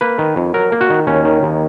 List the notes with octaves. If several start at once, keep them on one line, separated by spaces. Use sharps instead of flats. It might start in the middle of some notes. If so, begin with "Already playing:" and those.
A#3 B4
D#3
F2
F#3 A#4
A#3
F#4
D#3
D#2 C#4
D#3
D#2